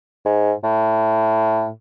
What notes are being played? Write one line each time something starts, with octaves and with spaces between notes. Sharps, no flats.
G#2
A2